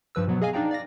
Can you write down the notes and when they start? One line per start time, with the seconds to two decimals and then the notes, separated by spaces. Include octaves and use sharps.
0.15 G2 F3 B4 E6
0.27 B2 F#3 B3
0.41 G#4 D#5 F5 G#5
0.53 D4 D#4 D5 F5 G5 A#5
0.71 D5 F5 A#6